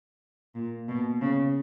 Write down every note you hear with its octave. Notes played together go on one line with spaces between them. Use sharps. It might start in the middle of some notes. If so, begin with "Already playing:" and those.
A#2
B2
C#3